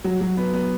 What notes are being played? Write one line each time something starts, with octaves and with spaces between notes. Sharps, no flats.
F#3
F#3
B3
B3